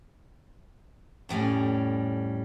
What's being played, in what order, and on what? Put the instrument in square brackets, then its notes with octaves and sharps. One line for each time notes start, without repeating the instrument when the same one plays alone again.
[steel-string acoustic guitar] F2 A2 G3 C#4